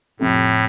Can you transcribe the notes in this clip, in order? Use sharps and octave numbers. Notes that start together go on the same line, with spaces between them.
F2 A2 C3 A3